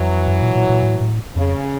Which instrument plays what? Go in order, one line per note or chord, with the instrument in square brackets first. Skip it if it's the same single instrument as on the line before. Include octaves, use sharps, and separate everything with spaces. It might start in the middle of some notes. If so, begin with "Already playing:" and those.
Already playing: [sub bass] F2 [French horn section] E3 F#3
[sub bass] F#2
A#2
A#2
A#2
A2
A2
[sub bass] F2 [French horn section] C#3